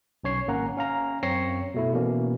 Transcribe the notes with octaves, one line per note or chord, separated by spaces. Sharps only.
B1 C#4 C#5 C7
G#1 A#3 C#4 F#5 A#5
C#4 F5 A#5
F#2 C4 C#5 A#6 C7 C#7
B2 A3 E4
B2 E3 A#3 C#4